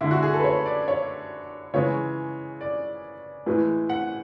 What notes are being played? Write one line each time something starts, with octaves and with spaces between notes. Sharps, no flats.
D3 G#3 E4
F#4
G#4
A4
B4
C#5
D5
C#5
C#3 E3 G#3 C#5
D5
A2 E3 G#3
F#5